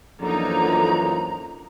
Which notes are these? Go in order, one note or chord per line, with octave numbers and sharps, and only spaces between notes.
F#2 D3 E3 F3 A#3 D#4 A#5